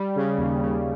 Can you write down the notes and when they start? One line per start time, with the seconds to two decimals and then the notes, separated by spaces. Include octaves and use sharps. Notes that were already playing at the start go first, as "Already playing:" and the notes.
Already playing: G3
0.16 C#3
0.38 D#2
0.61 C#3